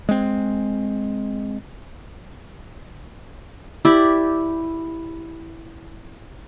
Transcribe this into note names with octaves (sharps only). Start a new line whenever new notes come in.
G#3 C4
E4 G4 D5